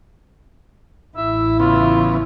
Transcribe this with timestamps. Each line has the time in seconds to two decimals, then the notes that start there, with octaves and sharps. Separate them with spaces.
1.17 A1 E4 E5
1.60 C#3 E3 B3 F4